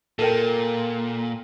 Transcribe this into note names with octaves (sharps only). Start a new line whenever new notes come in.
A#2 A4 A#4 G5